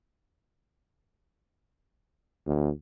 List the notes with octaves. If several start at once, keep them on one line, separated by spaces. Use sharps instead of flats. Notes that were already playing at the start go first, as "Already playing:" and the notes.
D2